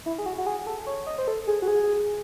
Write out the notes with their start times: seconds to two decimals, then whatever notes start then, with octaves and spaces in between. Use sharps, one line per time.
0.06 E4
0.18 G#4
0.26 F#4
0.38 F#4
0.46 G#4
0.66 A4
0.87 C#5
1.07 D#5
1.18 C5
1.28 A4
1.47 G#4
1.62 F#4
1.68 G#4